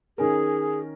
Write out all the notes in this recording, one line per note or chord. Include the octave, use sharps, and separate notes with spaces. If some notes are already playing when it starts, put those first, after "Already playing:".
D#3 C#4 G#4 A#4